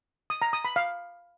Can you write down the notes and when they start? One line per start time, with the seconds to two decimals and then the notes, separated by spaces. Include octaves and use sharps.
0.30 D#6
0.42 A#5
0.53 D#6
0.65 B5
0.76 F5